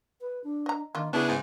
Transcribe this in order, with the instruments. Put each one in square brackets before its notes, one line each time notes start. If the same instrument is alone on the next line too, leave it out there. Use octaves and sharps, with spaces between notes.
[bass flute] B4
D4
[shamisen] D#5 A#5
[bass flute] D#3 [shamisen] A#3 D4 F4
[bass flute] C#3 [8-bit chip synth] B3 E4 G#4 [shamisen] C#4 [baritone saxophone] D4
[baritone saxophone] G#2